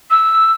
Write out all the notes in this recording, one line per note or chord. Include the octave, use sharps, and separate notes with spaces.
E6